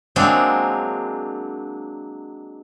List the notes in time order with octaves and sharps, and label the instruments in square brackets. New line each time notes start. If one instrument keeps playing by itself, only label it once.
[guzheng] F#3 G#3 A#3 C4 D4